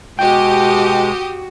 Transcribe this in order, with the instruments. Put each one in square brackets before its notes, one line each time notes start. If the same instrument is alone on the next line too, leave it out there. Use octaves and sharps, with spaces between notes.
[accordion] B2 G#3 [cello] F#4 [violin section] G4 D#6 [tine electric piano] G5